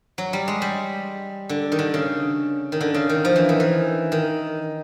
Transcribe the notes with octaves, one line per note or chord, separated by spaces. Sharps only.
F#3
G3
G#3
G3
D3
D#3
D3
C#3
D#3
D3
C#3
D#3
F3
E3
D#3
E3
D#3